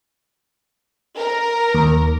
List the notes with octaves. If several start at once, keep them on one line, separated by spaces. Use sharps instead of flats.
A#4
D#2